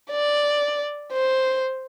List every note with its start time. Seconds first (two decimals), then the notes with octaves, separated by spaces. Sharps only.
0.10 D5
1.13 C5